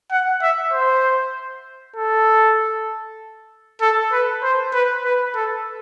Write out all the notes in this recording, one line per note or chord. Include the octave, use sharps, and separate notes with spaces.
F#5
E5
C5
A4
A4
B4
C5
B4
B4
A4